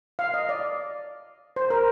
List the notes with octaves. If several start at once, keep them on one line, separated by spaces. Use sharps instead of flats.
F5
D#5
D5
C5
A#4